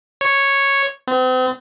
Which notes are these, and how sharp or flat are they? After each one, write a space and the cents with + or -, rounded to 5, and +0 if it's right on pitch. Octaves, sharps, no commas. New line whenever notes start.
C#5 -5
C4 -40